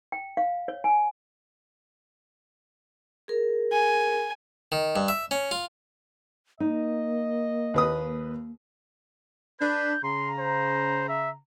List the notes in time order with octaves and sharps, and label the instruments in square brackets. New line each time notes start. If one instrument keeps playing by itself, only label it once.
[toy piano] G5
F5
C#5
G#5
[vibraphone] G#4 A#4
[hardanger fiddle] G#5
[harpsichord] D#3
G2
E5
C#4
F4
[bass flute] A#3 [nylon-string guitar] D#4 [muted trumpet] D#5
[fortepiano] D#2 B4 D#6
[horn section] D4 B4 [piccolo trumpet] G6
[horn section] C#3 A#5 [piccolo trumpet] C6
[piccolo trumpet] C5
E5